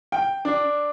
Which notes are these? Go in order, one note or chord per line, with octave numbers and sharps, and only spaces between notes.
G5
D4